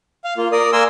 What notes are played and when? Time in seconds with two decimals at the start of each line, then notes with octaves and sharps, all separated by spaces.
0.24 F5
0.37 A#3 F4
0.52 A#4 D5 D#6
0.73 A#3 A#4 G#5 C6 E6